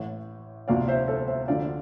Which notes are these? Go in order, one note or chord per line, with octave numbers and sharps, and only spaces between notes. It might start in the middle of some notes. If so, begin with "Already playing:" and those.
Already playing: A1 A2 E3
E1 D2 C3 F3 D5 F5
C5 E5
A4 C5
C5 E5
D2 D3 F3 D5 F5